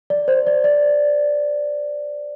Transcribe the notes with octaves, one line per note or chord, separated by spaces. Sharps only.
D5
C5
D5
D5